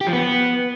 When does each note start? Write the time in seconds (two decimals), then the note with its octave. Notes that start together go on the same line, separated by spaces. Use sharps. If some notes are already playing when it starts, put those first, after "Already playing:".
0.01 G4
0.07 F3
0.13 B3